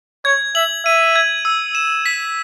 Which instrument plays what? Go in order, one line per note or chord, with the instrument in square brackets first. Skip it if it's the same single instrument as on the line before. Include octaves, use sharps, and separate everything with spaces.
[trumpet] C#5 [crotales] G#6
[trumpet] E5 [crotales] F#7
[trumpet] E5 [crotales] D#7
[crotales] G#6
E6
E7
B6